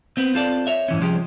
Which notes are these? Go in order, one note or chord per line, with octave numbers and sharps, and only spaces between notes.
B3 C4
C4 F4 A4 D5
C#5 E5
G#2 E3 C#4
C2 F3 G#3 C#4 G4